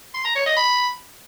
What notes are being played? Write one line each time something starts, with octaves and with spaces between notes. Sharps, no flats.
C6
A#5
C#5
D#5
B5